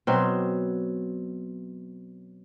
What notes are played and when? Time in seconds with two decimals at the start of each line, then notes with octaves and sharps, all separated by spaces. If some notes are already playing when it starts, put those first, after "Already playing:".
0.07 B2 F#3 C4